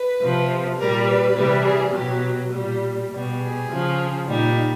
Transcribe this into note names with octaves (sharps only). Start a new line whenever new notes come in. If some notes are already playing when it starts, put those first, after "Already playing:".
Already playing: B4
C3 F3
A#2 G3 A#4
B4
C3 E3 G3
G#4
B2 F#3 G4
A#2 G3
B2 G3
G#4
C#3 F3
A#2 G3 D#4